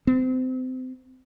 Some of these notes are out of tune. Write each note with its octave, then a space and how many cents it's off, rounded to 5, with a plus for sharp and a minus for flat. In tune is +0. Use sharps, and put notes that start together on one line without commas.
C4 -30